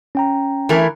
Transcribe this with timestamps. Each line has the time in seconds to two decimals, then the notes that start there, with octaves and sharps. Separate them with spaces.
0.15 C#4 G5 A#5
0.69 E3 A3 A#4